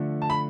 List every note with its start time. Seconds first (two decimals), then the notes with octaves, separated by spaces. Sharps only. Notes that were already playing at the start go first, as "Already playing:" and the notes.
Already playing: D3 F3 A3
0.22 A5
0.30 B5